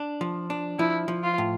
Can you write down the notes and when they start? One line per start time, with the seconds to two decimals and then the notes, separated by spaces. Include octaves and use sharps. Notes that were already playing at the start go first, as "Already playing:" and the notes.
Already playing: D4
0.21 F3
0.50 D4
0.79 F3 E4
1.08 F3
1.23 F4
1.38 A2